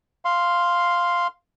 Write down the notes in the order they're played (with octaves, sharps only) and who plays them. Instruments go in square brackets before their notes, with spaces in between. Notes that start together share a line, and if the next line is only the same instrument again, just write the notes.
[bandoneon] F5 C6